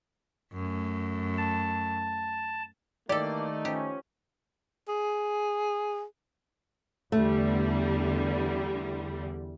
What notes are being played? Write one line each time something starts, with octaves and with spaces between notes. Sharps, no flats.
F#2 A3
A5
D#3 E3 A3 A#3 D#4 G4 A4 D5
F3 C#4 G4
G#4
E2 D3 G3 A3